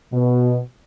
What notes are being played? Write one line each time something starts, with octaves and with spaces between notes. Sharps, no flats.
B2